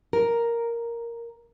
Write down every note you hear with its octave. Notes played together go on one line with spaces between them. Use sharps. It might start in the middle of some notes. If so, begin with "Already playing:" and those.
A#4